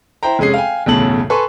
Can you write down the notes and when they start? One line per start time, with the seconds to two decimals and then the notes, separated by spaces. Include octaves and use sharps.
0.23 E4 C5 G5 A#5
0.39 F1 G#3 C#4 G#4 C7
0.54 F5 G5 G#5
0.86 B1 E2 A2 C#3 A5 F#7
1.30 A4 B4 G#5 C6 C#6